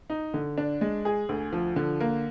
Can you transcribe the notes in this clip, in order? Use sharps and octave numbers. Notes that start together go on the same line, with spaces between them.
D#4
D3
D4
G#3
G#4
D2
F3
D3
A#3